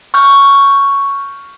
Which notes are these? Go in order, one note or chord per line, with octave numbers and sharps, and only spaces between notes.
C#6 F6 G6